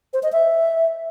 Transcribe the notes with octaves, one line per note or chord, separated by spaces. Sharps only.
C5
D#5
E5